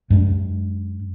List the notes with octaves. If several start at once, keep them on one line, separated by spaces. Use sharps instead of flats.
F#2 G#3 D4